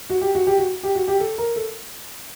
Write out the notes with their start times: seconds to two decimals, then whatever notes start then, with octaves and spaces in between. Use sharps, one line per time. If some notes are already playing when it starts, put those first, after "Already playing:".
0.10 F#4
0.21 G4
0.35 F#4
0.47 G4
0.58 F#4
0.83 G4
0.95 F#4
1.08 G4
1.20 A4
1.38 A#4
1.56 A4